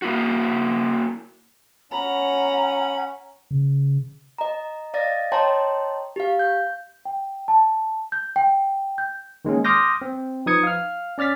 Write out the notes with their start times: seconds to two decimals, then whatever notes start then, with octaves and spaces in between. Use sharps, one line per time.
0.02 A#3 E4 F#4
1.92 C#4 F#5 A#5 B5
3.51 C#3
4.38 D#5 A#5
4.94 D5 D#5 F5 A6 A#6
5.32 C#5 D#5 G5 A5 A#5 C6
6.16 G4 F5
6.39 G6
7.05 G5
7.48 A5
8.12 G6
8.36 G5
8.98 G6
9.45 D#3 G#3 A#3 C#4
9.65 C6 D6 D#6 F6 G6 A#6
10.02 C4
10.46 F3 D#4 B4 D#6 G#6 C#7
10.63 F5 F6
11.18 C#4 D5 F6 A6 B6